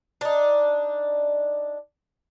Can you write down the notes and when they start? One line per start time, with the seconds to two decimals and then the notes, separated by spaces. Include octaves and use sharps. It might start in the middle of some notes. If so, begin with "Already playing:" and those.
0.21 D4 D#4